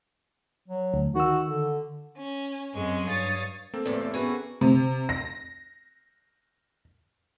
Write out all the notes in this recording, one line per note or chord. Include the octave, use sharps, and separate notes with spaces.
F#3
D2
D#3 F#4 E6
D3
C#4
F#2 F#3 G#3 C4 G#4 C#6
G2 C#5 F5 D#6 A6
A#3 C4 A4
E2 A2 C3
E3 B3 C#4 F#4 G#4
C3
A#6